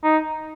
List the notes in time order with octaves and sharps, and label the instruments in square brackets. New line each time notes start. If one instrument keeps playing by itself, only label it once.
[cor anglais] D#4